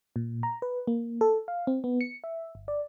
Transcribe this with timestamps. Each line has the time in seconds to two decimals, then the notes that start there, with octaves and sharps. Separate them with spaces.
0.16 A#2
0.43 A#5
0.62 B4
0.87 A#3
1.21 A4
1.48 F5
1.67 C4
1.84 B3
2.01 C#7
2.24 E5
2.55 G1
2.68 D5